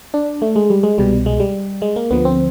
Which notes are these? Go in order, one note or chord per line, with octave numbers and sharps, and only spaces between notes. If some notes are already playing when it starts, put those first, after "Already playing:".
D4
A3
G#3
G3
G#3
C2 B2 G3
G#3
G3
G#3
A#3
D2 D3 F3 B3
C4